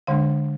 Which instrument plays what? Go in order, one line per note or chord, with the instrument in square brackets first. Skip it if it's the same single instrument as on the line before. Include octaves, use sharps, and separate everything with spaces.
[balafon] D3 G#3 D4 F5